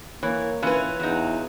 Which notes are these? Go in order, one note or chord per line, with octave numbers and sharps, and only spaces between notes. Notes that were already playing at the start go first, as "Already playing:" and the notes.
E3 A#3 C#5
E3 C#4 F4 B4
E2 F#3 D#4